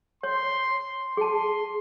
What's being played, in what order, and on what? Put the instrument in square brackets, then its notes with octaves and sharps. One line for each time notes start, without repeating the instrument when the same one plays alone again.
[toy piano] C#5 [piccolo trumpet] C6
[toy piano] G#4 A5 [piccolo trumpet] C6